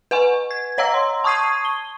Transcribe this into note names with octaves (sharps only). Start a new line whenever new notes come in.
B4 F#5 G#5 C#6
G#6
C#5 D#5 F#5 A#5 E6 A#6
C6
A5 C#6 D#6 G#6 C7 D#7
G7